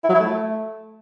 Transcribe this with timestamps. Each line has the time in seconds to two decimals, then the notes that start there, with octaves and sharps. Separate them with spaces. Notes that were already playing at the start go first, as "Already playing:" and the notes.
0.04 E4
0.09 F#3
0.14 E4
0.20 A3